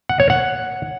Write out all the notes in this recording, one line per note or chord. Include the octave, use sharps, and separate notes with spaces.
F#5
C#5
F#5